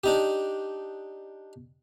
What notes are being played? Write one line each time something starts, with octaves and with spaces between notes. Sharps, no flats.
D4 D#4 G4